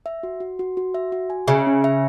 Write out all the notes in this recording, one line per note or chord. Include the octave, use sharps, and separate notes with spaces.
E5
F#4
F#4
F#4
F#4
E5
F#4
G#5
C#3 E5
C#4
E5